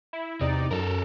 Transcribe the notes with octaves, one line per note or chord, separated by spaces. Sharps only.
E4
E2 C3 D#4 D5
F#2 A4 A#4